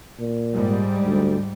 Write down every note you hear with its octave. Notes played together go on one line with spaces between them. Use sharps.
A#2
G#2 G3
D2